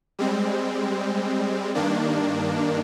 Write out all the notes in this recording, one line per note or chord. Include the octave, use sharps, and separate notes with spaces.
G3 G#3 C4
G2 D#3 A#3 D4